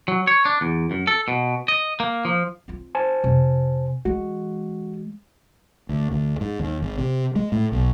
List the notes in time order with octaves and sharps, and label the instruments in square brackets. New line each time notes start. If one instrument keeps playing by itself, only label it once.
[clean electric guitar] F#3
C#5
D4
E2
F#2
A4
B2
D#5
A#3
F3
[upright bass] C4 F4
[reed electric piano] C5 G#5 A5
[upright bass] F2 C3
[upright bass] E3 G#3 [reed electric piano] F#4
[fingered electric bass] D2
D2
G#2
D#2
G#1
C3
G#3
A2
B1